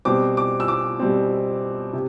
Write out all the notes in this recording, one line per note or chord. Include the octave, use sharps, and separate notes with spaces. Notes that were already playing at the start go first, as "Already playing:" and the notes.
B2 G3 C4 D6
D6
E6
D6
B2 G3 C4
C3